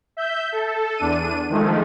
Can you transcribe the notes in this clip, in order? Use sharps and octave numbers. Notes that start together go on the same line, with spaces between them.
E5 G6
A4
E2 D4 D#7
D#3 F3 G#3 A3